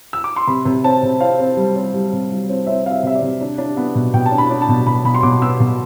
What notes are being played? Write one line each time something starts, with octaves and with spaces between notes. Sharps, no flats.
E6
D6
C6
C3 B5
C3
C4 A5
C3
C4 F5
C4
G3
C4
G3
C3
G3
C4
C4 E5
C4 F5
E5
C3 E5
D5
C3
D4
D4
B3
B2
B2 G5
A5
D4
B5
D4
A5
B2
B2 B5
B2 B5
C6
B2 D6
B3 E6
B2